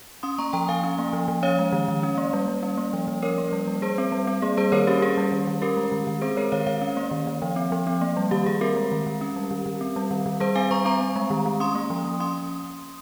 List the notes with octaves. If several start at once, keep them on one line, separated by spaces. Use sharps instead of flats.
C#4 C6 D#6
A#3 A#5 C#6
F3 G5 A#5
F3 F5 G#5
C#4
A#3
F3
F3
C#4 C#5 F5
G#3
D#3
D#3
C#4
A#3
G3
G3
C#4
A#3
F3
F3
C#4 A#4 C#5
A#3
G3
G3
G3 G#4 C5
C4
G3
C4
A#3 G#4
G3 G#4 C5
D#3 A#4 C#5
C#4 G4
C#4 G#4
G3
D#3
D#3
C#4 G4 A#4
G#3
D#3
D#3
C4 G#4 C5
G#3 A#4 C#5
D#3 C#5 F5
D#3 C#5 F5
C#4
A#3
D#3
D#3
F3
C4
F3
C4
A#3
G3
D#3 G4
D#3 G#4
C4 G4 A#4
G#3
D#3
D#3
C#4
G3
D#3
D#3
C4
G3
D#3
D#3
G3 G#4 C5
C4 F5 G#5
G3 A#5 C#6
C4 A#5 C#6
C4
G#3
D#3
D#3
C#4 C6 D#6
A#3
F3
F3
C#4 C6 D#6